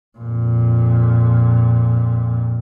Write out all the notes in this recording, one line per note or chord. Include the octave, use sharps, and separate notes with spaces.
F2 A#2